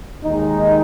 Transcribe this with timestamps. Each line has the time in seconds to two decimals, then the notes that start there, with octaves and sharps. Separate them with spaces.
0.25 D#2 D#3 G#3 D#4